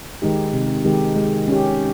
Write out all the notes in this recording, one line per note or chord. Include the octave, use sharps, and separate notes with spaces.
D#3 G#3 D#4 G4
C3
D#3 G#3 D#4 G4
G#3
C#4 G4